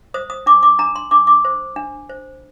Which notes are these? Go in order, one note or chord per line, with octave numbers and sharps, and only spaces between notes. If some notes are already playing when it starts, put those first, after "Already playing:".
C5 D#6
D#6
D4 D6
D6
D4 A#5
C6
D4 D6
D6
C5
D4
C5